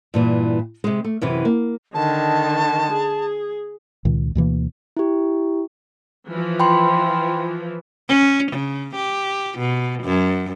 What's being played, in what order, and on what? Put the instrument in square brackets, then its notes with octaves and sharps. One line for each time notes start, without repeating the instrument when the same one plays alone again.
[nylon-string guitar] G2 A#2 E3
C3 G#3
A3
F#2 C3 E3
A#3
[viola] D3 D#3 [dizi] A5
[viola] G#4
[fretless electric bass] C#2 A#2 D#3
D2 B2 E3 A#3
[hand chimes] E4 G4
[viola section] E3 F3
[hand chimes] G5 B5 C6
[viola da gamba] C#4
C#3
G4
B2
F#2